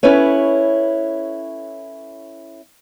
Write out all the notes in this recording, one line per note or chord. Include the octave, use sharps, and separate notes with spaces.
C#4 E4 A4 B4 C#5